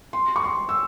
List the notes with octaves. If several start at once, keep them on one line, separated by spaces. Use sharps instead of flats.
C6
C#6
C6
E6